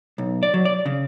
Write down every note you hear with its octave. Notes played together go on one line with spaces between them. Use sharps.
B1
D5
F#3
D5
C#3